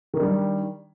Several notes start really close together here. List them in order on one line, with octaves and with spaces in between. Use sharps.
D#3 D4 G3